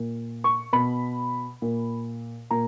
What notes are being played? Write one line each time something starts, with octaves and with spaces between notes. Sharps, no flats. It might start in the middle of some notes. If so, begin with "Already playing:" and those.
Already playing: A#2
C#6
B2 B5
A#2
A#2 A#5